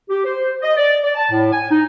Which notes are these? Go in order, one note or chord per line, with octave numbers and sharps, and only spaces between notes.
G4
C5
D#5
D5
D5
A5
A2
G#5
D#4